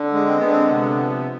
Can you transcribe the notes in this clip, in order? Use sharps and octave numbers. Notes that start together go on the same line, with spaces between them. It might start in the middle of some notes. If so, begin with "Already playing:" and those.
Already playing: D3
G#3
C4
D3 B3
C4
C3 B3
F3